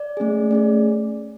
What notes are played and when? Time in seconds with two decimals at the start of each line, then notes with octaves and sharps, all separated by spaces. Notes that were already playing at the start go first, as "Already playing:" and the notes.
Already playing: D5
0.17 A3 C#4 G#4
0.51 A3 C#4 G#4 D5